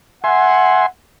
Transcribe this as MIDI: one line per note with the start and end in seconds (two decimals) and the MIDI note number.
0.24 0.86 76
0.24 0.87 78
0.24 0.86 80
0.24 0.86 84